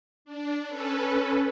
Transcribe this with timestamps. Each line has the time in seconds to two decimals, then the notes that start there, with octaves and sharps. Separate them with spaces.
0.25 D4
0.67 C#4 A4 B4